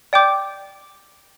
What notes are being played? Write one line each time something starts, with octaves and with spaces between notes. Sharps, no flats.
D5 G5 D6 G6